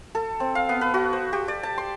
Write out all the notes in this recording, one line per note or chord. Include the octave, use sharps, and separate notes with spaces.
A4
C4
F5
B3
B4
F#4
C5
G4
D5
A5
C6